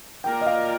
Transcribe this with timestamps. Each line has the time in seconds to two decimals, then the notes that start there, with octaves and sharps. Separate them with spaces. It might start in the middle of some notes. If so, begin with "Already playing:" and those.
0.24 A#3 F4 A#4 D5 G5
0.41 D#5
0.46 F5